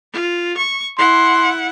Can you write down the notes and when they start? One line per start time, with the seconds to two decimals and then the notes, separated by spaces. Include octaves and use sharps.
0.14 F4
0.57 C#6
0.98 E4 F#5 C6